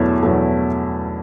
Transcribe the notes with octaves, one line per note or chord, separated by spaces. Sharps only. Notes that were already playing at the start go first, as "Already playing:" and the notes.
Already playing: E2 B2 F#3 A3 E4
E2 B2 F#3 A3